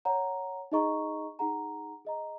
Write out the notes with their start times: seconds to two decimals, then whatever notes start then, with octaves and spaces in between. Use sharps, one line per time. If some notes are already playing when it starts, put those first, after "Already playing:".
0.05 C#5 F#5 A#5
0.72 D#4 G#4 D#5 A#5 C#6
1.39 D#4 G#4 F#5 A#5
2.05 G#4 D#5 A#5